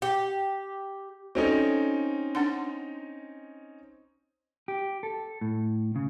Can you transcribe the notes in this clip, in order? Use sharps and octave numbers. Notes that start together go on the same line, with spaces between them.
G4
C4 C#4 D#4 F#4 A4 D5
D4 F#5 C6
G4
A4
A2
C#3